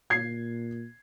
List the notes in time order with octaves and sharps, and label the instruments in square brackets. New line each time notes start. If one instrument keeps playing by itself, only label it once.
[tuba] A#2 [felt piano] G#6 C7